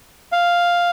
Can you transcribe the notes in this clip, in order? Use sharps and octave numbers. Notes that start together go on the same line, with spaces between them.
F5